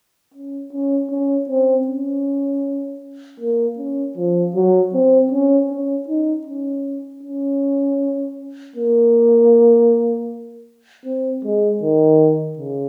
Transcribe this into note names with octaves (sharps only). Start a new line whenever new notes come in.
C#4
C#4
C#4
C4
C#4
A#3
C#4
F3
F#3
C4
C#4
C#4
D#4
C#4
C#4
A#3
C4
G#3
D#3
C#3